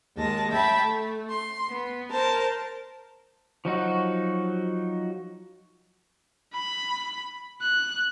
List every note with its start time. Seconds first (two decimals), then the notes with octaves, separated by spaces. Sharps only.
0.17 D#2 G#3 A5 A#6
0.50 E5 G5 A5 B5
0.82 A3
1.30 C6
1.69 B3
2.11 A#4 C5 A5 A#5
3.65 F3 F#3 D#4 F#4
6.53 B5
7.62 F#6